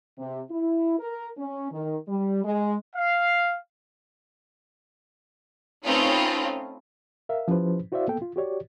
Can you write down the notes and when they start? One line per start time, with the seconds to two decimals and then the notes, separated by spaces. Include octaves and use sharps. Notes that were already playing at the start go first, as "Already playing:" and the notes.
0.19 C3
0.50 E4
0.99 A#4
1.38 C#4
1.72 D#3
2.08 G3
2.44 G#3
2.95 F5
5.83 A3 C4 C#4 D#4 F4 B4
7.29 A#4 E5 F5
7.48 F3 C#4 E4 G4 B4 C5
7.92 E4 F#4 C5 D5 E5 F5
8.08 A#3 B3 A4 G5
8.22 F4
8.36 F#4 G4 C#5 D5